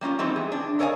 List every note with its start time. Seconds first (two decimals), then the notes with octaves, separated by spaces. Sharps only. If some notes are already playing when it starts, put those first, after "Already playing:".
0.01 G3 A#3 C#4 F4
0.19 E3 G3 B3 C4 D#4
0.36 G#4
0.52 D4
0.79 A4 A#4 C#5 D#5 F5 G#5